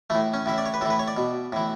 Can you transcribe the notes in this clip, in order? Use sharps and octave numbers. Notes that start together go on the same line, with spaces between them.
A2 E3 A3
C#4
A2 E3 E5
D5
C#5
B4
A2 E3 A4 B4
C#5
D5
B2
A2 E3